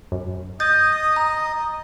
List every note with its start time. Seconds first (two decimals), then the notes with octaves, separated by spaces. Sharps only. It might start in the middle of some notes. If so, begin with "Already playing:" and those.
0.12 F#2
0.60 D#5 D#6 G6 A6
1.16 A#5